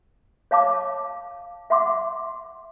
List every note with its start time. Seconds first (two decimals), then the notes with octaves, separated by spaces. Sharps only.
0.51 C#5 F5 A5 D6
1.70 E5 F#5 C6 D6